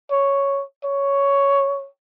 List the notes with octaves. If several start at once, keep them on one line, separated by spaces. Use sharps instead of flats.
C#5
C#5